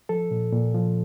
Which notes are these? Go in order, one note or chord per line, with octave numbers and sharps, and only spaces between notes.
F3 A4
A#2
A#2
F3